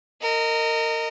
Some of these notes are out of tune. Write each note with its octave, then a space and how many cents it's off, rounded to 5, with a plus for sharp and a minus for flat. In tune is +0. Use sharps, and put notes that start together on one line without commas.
A#4 -25 D#5 +0